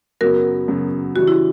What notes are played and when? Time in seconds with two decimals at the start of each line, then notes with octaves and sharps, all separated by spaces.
0.21 F#2 C#3 F#3 B3 F#4 A#4
0.68 F#2 C#3 F#3 B3
1.16 C#3 E3 G3 F#4
1.28 E4